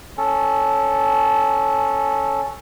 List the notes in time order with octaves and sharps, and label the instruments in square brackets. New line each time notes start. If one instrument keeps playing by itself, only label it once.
[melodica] C#4 A4